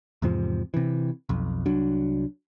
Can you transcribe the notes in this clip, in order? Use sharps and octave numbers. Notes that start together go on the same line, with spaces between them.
E2 G#2 C3 F3
C3 E3
B1 F2
C2 F#3 D4